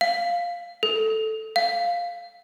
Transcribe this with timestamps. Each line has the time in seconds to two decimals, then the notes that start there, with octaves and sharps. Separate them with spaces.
0.01 F5
0.83 A4
1.56 F5